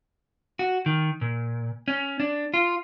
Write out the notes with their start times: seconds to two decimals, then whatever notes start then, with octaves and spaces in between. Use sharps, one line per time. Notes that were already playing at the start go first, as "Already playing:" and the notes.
0.59 F#4
0.86 D#3
1.21 A#2
1.88 C#4
2.20 D4
2.54 F4